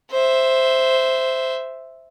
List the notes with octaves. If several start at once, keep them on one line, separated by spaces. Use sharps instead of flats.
C5 E5